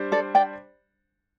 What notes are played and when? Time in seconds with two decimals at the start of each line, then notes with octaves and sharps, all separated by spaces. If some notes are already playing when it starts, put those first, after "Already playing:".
Already playing: G3 D4 C5
0.12 A4 D5
0.35 D5 G5